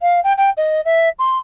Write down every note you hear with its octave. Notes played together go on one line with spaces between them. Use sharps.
F5
G5
G5
D#5
E5
C6